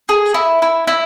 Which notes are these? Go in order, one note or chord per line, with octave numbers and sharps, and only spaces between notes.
G#4
E4
E4
E4